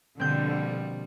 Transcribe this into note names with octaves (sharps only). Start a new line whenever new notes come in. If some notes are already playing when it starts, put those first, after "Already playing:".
B2 D3 F3 G3 A#3 C4 G6